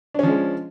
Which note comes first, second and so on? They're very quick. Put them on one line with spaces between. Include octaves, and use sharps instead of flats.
D4 C#4 F3 G#3